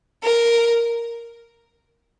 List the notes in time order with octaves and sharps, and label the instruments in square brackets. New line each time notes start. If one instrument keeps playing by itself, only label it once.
[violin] A#4